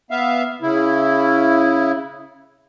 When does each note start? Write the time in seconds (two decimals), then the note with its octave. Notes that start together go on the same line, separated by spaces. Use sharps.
0.11 B3 E5 F5
0.62 C#3 E4